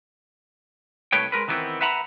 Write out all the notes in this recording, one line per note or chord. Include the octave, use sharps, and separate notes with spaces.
C2 A3 B4 C#5 G5
G#3 A#4 B4
D#3 E3 G3 B3 C4
B4 E5 F#5 A#5 B5